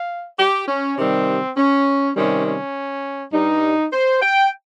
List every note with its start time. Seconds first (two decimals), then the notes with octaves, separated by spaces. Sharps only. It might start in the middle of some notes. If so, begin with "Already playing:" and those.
Already playing: F5
0.39 G4
0.68 C#4
0.98 C3 D#3 G3 C4
1.57 C#4
2.15 C3 D#3 G3 C#4
2.45 C#4
3.33 G2 G3 D#4
3.92 C5
4.21 G5